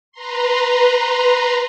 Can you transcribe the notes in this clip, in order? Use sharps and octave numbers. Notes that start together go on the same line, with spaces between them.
B4 A#5 C6